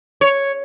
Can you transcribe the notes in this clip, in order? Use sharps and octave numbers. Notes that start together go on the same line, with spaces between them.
C#5